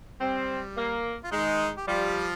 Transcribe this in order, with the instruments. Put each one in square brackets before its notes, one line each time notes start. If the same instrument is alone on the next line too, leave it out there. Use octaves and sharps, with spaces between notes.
[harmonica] G3 [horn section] C4
[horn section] A#3
[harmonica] F4
[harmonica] D#3 D#4 [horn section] G#3
[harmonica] G4
[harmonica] F3 F4 [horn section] G3